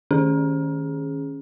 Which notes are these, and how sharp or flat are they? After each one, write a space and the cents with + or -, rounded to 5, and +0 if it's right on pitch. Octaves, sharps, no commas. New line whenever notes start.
D#3 +0 C#4 +0 G#4 +0